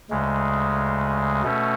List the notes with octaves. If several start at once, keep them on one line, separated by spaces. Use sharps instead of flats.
D2 C#3 G#3
B2 A3 C#4